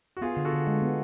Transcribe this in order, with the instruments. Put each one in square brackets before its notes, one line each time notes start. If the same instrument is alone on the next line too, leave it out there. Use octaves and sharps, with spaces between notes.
[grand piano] F#4
[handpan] B3 [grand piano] F4 G#4
[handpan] D3
[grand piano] F#4 A4
[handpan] D3
G#3
B3